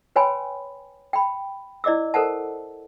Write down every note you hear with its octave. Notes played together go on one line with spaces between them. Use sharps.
B4 C#5 G5 G#5 B5 C6
G5 B5
E4 D5 D#5 D6 E6
A4 A#4 C5 F#5 A5